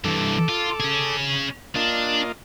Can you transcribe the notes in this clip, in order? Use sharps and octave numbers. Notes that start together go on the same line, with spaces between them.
G2 E3 A4 D6
F4
C#4 G#4
A#3 D4 F4 D#5